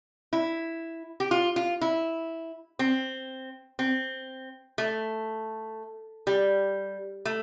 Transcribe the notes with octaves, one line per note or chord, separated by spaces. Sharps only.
E4
G4
F4
F4
E4
C4
C4
A3
G3
A3